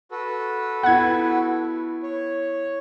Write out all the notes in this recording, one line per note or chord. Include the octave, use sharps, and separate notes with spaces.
F#4 A4 B4
B3 E4 F#5 G#6
C#5